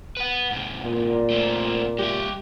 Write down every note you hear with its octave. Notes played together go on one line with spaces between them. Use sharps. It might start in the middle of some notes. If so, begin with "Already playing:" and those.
B4 F#5
G#2 C3
A#2
A3 C4
G#3 G4 E5